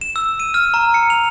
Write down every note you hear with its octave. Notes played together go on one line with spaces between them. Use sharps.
E7
E6
D#7
F6
A#5
C#7
F7